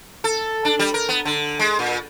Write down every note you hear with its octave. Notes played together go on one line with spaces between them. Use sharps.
A4
D4
G3
A#4
B3
D3
G#3
A#2